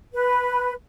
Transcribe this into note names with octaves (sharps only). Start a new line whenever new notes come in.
B4